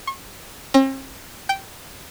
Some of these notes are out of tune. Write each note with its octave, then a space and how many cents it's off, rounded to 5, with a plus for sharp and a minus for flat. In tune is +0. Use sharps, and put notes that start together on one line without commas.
C#6 -40
C4 +45
G5 -10